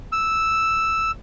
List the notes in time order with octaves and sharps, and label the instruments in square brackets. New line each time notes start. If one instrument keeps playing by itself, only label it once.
[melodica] E6